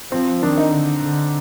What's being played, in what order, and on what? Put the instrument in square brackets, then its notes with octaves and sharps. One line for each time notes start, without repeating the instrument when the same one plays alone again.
[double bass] F3 [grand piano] C4
[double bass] D#3 [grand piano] D4
[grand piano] D#4
[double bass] D3
D3